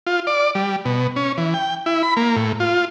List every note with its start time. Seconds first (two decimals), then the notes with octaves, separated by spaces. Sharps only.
0.07 F4
0.27 D5
0.55 G3
0.85 B2
1.16 C#4
1.38 E3
1.54 G5
1.86 E4
2.03 B5
2.17 A#3
2.36 A2
2.60 F4